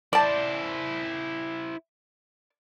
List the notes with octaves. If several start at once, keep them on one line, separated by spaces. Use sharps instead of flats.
E4 C5 D5 A5